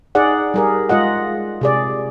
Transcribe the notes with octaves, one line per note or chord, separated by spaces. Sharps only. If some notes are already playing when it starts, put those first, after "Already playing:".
D#4 G#4 D5 F#5
G3 G#4 A#4
G#3 F4 D#5 F#5
C3 G#4 D5